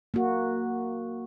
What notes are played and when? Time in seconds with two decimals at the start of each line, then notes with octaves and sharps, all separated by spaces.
0.14 A#3 F#4